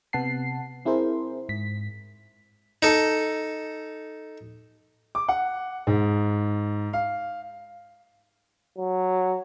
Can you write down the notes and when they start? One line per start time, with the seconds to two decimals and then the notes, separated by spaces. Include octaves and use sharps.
0.13 C3 B3 F#5 A5 C7
0.85 C4 E4 G#4 A#4 C5
1.49 G#2 B6
2.82 D#4 A4
5.15 D6
5.28 F#5
5.87 G#2
6.93 F5
8.78 F#3